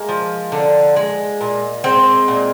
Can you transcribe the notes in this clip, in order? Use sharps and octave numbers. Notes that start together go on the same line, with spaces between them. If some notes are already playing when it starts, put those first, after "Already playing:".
Already playing: G#3 A#3
F3
D3
G#3
A#2
G#3 C4
A#2